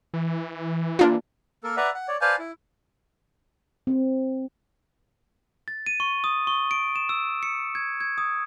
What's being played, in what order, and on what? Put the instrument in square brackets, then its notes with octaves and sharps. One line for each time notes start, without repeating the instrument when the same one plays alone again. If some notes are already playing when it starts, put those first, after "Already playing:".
[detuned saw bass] E3
[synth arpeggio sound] A#3 D4 F4
[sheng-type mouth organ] A#3 A4 A#4
B4 D5 E5 F#5 A#5
F#5
C#5 D5
B4 C5 D5 F5 G#5 A5
E4
[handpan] C4
[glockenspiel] A6
D#7
C#6
D#6
C#6
D7
E7
E6
C#7
G#6
G#6
D#6